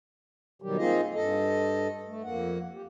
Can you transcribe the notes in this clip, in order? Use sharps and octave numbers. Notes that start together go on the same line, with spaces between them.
B2 D#3 F#3 G3 G4
A#3 C4 D#4 F4 G#4 D#5
G2 A4 D#5
A3
F2 A#3 F#5
G4